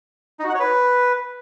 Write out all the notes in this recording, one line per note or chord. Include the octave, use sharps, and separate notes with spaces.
D#4
F#4
F#5
C#5
B4